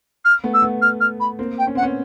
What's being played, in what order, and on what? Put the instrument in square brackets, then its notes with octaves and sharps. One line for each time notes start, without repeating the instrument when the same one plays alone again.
[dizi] F6
[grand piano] A3 B3
[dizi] E6
[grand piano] A3 B3
[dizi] F6
F6
B5
[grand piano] A#3 C4
[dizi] G5
[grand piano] C#4
[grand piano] C4 [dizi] F#5
[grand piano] B3 C#4